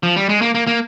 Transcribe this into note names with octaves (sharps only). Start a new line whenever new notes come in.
F3
G3
G#3
A#3
A#3
A#3